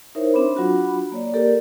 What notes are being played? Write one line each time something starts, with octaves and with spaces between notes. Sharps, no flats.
D#4 E4 A#4 C5 C#5 E5
C4 D4 C5 B5
F#3 D4 F4 F#4 B5
A#3 C#5 D5
A#3 G4 A4 A#4 D5